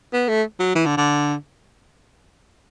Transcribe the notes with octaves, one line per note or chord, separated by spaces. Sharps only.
B3
A3
F#3
E3
D3
D3